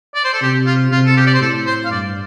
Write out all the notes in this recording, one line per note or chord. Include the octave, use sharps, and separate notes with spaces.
D5
C5
A4
C3 G4
F4
C3 F4
A4
G4
D5
C5
A2 A4
C5
F5
G2 D5